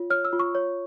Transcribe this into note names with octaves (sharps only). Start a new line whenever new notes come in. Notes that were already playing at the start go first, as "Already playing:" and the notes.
Already playing: F4 C#5
C#5 F6
E6
F4
C#6
C#5